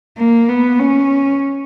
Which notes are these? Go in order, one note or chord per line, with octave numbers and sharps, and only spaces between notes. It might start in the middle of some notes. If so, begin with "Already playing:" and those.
A#3
B3
C#4